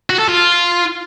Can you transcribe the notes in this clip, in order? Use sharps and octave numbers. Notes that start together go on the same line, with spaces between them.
F#4
A4
F4